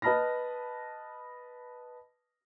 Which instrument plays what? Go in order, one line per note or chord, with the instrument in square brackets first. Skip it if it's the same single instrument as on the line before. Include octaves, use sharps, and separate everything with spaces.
[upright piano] B4 D#5 A5 B5 F6 A#6